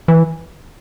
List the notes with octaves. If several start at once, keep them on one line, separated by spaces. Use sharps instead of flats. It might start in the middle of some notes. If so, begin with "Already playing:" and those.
E3